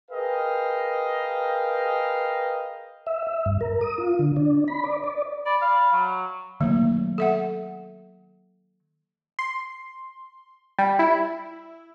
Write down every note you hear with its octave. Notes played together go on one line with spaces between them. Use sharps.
G#4 A#4 B4 D#5 F5 G5
E5
E5
G2
A#4
D#6
F4
D3
D4
B5
D5
D5
D5 B5
F5
F#3
D#3 F#3 A3 A#3
A4 E5 F#5
C6
G3
E4